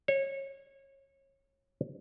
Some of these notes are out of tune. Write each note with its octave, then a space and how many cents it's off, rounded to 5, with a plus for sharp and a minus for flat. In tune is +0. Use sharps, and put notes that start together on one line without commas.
C#5 -25